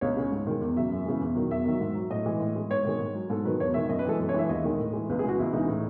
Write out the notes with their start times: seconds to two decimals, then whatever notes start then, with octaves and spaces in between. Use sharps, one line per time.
0.01 C#2 C#5
0.17 C#3 G#3
0.32 G#2
0.47 D#3 G#3
0.61 E2
0.76 C#3 F#3 E5
0.92 F#2
1.06 C#3 E3 G#3
1.21 E2
1.35 D#3 F#3
1.50 E2 E5
1.66 D#3 F#3
1.81 G#2
1.95 F#3
2.10 A2 D#5
2.26 E3 G#3
2.40 A2
2.56 G#3
2.70 G#2 C#5
2.85 D#3 G#3
3.00 G#2
3.15 F#3
3.30 G#2 A4
3.45 D#3 F#3 B4
3.60 E2 C#5
3.74 D#3 G#3 E5
3.89 F#2 D#5
3.99 B4
4.05 E3 G#3 A4
4.19 F#2
4.29 C#5
4.34 E3 G#3 E5
4.49 D#2 D#5
4.64 D#3 G#3
4.79 A2
4.93 E3 G#3
5.09 C#2 B4
5.19 G#4
5.24 C#3 E3 G#3 F#4
5.38 C#2 E4
5.53 C#3 E3 G#3 D#4
5.68 A2